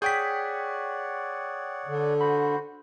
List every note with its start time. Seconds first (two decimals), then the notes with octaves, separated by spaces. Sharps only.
0.02 G#4 C#5 D5 F#5 G5 C#6 G6 B6
1.88 D3
2.21 F#4 C5 B5